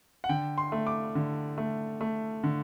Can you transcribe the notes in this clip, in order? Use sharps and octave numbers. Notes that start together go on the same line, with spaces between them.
F#5
D3 G5
C6
A3
D6
D3
A3
A3
D3